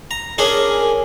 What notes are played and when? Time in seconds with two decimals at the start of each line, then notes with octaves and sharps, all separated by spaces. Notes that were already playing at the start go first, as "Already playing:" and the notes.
0.11 A#5
0.38 C#4 D4 G#4 A#4